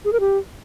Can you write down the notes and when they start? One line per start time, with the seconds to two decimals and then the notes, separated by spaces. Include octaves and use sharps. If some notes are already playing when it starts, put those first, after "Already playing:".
0.05 G#4
0.12 A#4
0.20 G4